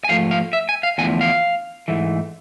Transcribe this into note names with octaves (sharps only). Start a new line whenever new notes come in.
G#5
G#2 F3 A3 F5
F5
E5
G#5
F5
E2 D3 F3 A3 G#5
F5
G#2 E3 A3